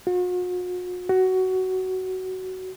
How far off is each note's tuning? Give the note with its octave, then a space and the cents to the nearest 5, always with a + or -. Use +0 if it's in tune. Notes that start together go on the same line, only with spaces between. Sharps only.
F#4 -45
F#4 +15